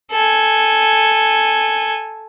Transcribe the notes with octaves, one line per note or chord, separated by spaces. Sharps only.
A4 G#5